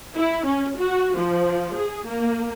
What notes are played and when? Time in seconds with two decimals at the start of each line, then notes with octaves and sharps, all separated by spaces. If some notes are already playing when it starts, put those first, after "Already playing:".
0.17 E4
0.46 C#4
0.78 F#4
1.17 F3
1.76 G#4
2.07 A#3